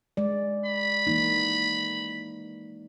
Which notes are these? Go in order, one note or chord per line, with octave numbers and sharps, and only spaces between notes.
G#3 D5
B5
E3 A#3 D#4